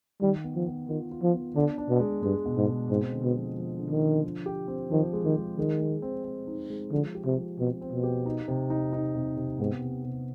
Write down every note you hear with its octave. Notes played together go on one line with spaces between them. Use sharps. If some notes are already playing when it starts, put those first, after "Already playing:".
D#3 G3
B3
F3
B3
D#3 F4
F4
F3
B3
D3 D4
D4
B2
G#3
G2 G#3
B2
G#2
G#3
G#2 C4
D3
B2
F3
F3
D3
D#3
D3
F3
G4
C4
D#3 F3
G#3
D#3
G#3
D#3 G#3
G#3
C4
C4
D#4
G#3
D3 F3
G4
C3
F3
B2 C4
C4
B2
G4
D#4
C3
D#4
D#4
C3
C3
G#2 B3
C3
C3